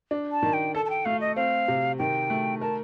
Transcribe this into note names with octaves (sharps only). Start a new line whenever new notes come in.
D4
A5
D#3
G5
A4 A5
A5
G5
A3 F5
D#5
C4 F5
C3
D#3 G5
A3
A#4 A5